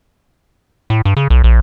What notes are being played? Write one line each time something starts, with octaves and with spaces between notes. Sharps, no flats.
A2
G2
C#3
B1
A#1